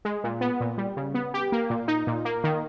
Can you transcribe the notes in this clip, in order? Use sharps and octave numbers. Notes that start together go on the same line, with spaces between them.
G#3
A#2
B3
A#2
G3
C#3
B3
G4
A#3
A#2
D#4
A#2
A#3
D#3